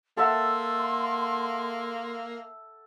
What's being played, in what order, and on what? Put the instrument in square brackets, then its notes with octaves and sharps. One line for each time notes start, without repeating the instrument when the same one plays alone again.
[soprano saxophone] A#3 [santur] A4 E5 F#5 [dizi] C6